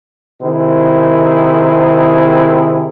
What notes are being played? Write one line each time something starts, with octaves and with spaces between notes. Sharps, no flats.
C3 D#3 E4 G#4 C5